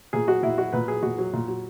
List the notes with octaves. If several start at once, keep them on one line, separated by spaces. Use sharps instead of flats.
A#2 G#4
F#3 F#4
A#2 E4
F#3 F#4
A#2 B4
F#3 G#4
A#2 F#4
F#3
A#2
F#3